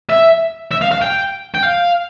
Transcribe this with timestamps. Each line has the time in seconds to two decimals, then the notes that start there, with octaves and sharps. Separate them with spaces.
0.10 E5
0.71 E5
0.81 F5
0.91 F5
1.02 G5
1.55 G5
1.63 F5